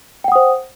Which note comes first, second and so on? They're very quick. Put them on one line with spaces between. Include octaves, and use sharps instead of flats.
G5 F#5 D#6 C5